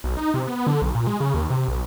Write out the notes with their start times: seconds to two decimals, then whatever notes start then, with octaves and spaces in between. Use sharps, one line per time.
0.04 B1
0.17 D#4
0.34 C3
0.47 B3
0.67 D3
0.82 B1
0.95 A#2
1.07 G#3
1.20 C#3
1.34 D#2
1.50 C3
1.68 B1